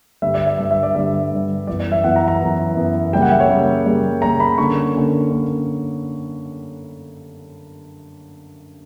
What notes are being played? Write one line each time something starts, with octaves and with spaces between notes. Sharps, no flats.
G2 D3 G3 E5
D5
E5
G2 D3 G3
E5
D5
G2 D3 G3 E5
G2 D3 G3
F#2 E3 B3 D5
D5
E5
F#2 E3 B3 F#5
A#5
A#5
F#2 E3 B3
F#2 E3 B3
C#3 G3 A#3 G5
F#5
E5
C#5
C#3 G3 A#3
C#3 G3 A#3
C#3 G3 A#3 A#5
B5
D3 A#3 C#4 C#6
D3 A#3 C#4
D3 A#3 C#4